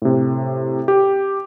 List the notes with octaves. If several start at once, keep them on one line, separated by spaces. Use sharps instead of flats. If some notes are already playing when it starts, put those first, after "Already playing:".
A2 C3
G4